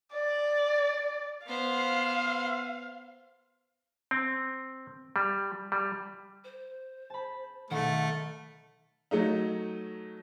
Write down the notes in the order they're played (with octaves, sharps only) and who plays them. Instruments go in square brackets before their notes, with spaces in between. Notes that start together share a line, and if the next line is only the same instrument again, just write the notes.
[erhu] D5
[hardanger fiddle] B3 C5 [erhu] F5
[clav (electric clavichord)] C4
G3
G3
[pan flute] C5
[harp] A5 B5
[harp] B1 D#3 [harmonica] A3 [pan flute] F#5
[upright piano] F#3 A3 D#4